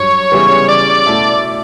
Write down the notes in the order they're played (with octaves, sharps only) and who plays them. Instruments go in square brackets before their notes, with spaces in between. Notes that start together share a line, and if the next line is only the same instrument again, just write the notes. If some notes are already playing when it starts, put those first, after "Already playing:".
Already playing: [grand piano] G2 F#3 [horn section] C#5
[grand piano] C#3 E3 G3 B3
[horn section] D5
[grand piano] B2 A3 E4 A4